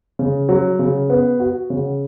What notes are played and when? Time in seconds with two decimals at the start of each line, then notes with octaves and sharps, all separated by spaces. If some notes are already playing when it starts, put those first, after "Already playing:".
0.19 C#3
0.49 F#3
0.79 C#3
1.10 B3
1.40 F#4
1.70 C#3